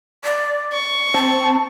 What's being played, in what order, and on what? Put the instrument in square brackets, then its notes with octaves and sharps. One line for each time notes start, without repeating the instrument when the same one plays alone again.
[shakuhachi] D5
[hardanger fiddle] C#6
[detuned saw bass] C4 [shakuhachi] A5